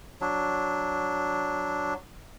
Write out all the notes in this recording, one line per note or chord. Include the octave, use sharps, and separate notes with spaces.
F#3 D4